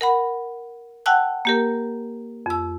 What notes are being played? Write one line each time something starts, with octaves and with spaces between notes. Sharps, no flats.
A#4 F#5 B5
F#5 G5 A5 E6 F#6
A#3 G4 A#4
F2 E6